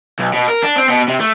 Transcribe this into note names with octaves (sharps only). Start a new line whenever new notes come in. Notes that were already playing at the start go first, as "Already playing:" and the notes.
B1
B2
A#4
D4
C4
B2
C3
A3